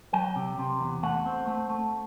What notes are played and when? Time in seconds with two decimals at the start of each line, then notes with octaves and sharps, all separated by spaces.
0.13 F#3 G5
0.36 C3
0.59 C3
0.80 E2
1.03 A3 F#5
1.26 C4
1.47 A3
1.70 A3